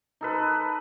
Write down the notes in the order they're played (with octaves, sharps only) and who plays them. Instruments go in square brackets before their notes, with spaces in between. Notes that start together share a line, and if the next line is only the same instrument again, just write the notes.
[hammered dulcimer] D#4 A4 B4